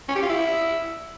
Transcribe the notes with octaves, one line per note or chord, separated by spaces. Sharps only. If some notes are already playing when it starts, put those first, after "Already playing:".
C#4
G4
F4
E4